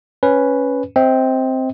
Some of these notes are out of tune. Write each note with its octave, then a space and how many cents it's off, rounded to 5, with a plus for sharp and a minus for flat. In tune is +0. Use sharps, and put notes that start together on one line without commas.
C#4 +0 B4 +0
C4 +0 D#5 +40